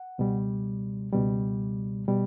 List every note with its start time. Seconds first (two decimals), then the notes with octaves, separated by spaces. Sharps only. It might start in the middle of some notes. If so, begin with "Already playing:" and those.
Already playing: F#5
0.18 C#2 B2 G3
1.13 C#2 B2 G3
2.08 B2 G3